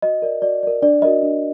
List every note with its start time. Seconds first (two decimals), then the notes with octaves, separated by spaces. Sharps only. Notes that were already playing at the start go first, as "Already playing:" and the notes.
0.02 F#4 D#5
0.22 A#4 D5
0.42 F#4 D5
0.63 A#4 D5
0.82 D4 D5
1.02 F#4 A#4 D5 D#5
1.23 D4